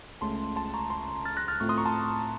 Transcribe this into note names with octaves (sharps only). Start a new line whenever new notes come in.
C#2 C#3 A3 C#4 A5 C6
A5 C6
A#5 C#6
A5 C6
F6 A6
F#6 A#6
F6 A6
A2 A3 C4 F4 C#6 F6
C6 D#6
A#5 C#6
A5 C6